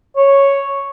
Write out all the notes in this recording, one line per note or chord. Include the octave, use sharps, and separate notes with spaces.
C#5